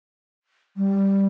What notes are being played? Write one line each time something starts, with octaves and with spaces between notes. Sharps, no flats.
G3